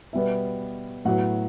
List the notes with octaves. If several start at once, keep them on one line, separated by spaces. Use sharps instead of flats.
B2 G3 B3 E5
A2 F#3 B3 F#5